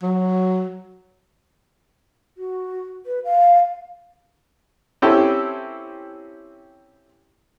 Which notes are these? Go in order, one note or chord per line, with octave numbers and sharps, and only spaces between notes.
F#3
F#4
B4
F5
C4 C#4 E4 G4 A4